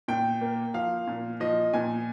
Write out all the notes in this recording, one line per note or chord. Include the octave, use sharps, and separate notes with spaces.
A#2 G5
A#3
F3 F5
A#2
F3 D#5
A#2 G#5